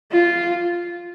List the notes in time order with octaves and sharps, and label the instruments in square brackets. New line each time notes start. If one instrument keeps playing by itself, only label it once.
[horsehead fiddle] F4